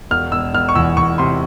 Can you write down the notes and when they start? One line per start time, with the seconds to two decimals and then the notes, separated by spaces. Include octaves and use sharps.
0.11 E1 F6
0.32 E1 E6
0.54 E1 F6
0.69 C#6
0.75 E2 E6
0.97 E2 C#6
1.18 C3 C6